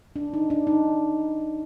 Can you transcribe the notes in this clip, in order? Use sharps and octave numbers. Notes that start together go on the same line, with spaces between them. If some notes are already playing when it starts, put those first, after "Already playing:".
D4
D#4
D4
D#4